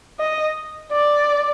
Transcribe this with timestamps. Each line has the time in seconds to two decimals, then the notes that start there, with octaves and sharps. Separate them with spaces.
0.20 D#5
0.92 D5